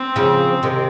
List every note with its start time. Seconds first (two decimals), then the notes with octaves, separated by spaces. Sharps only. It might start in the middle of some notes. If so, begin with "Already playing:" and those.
Already playing: C4
0.16 C#3 F3
0.63 C3 D#3